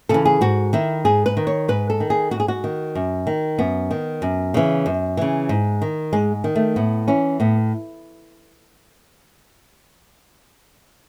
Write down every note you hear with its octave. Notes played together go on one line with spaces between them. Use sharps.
C#3 E3 A4
G#4
G#2 F#4
D#3 E4
G#2 G#4
B4
D#3
C#5
G#2 B4
A4
D#3
G#4
G#2 F#4
G#4
F#4
D#3
F#2
D#3
F#2 B3
D#3
F#2
C#3 E3
F#2
C#3 E3
G#2
D#3
G#2 G#3
D#3
A3
A2 B3
E3 C#4
A2 B3